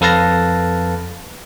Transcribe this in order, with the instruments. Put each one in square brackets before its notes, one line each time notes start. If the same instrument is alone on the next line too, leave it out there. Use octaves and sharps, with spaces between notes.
[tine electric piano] F2 A4 B4 F5 A5 A#6